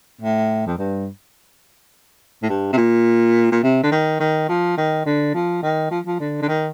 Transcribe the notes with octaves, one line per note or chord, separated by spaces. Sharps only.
A2
F2
G2
A2
G2
C3
A#2
A#2
C3
D3
D#3
D#3
F3
D#3
D3
F3
D#3
F3
F3
D3
D3
D#3